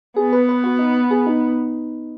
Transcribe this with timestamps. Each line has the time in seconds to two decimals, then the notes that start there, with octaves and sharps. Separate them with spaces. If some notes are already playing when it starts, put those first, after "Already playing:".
0.16 B3 G#4
0.33 B4
0.49 B4
0.64 F#4
0.79 D#4
1.11 G#4
1.27 D#4